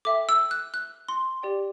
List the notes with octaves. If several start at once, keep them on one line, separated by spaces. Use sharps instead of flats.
A4 E5 G5 D6
E6
F#6
F#6
C6
G4 D5 G5